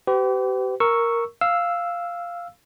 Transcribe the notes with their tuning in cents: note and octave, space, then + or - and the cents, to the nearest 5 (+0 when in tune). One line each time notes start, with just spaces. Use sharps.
G4 -35 B4 +45
A#4 +0 C#6 +0 E6 +0
F5 -5 E6 +0